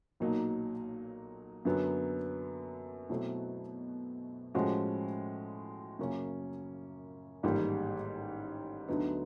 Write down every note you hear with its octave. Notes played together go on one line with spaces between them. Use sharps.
B1 A#2 F#3 A#3 D#4
F#2 D3 F#3 B3
B2 F#3 A3 C4 E4
A2 F3 G#3 C#4 F#4
F#2 C#3 F#3 A#3 C#4
A1 G#2 D#3 G3 A#3
D2 D3 F#3 B3 D#4